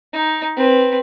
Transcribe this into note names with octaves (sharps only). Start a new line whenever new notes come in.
D#4
C4 B4